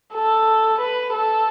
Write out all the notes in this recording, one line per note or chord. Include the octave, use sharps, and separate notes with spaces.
A4
B4
A4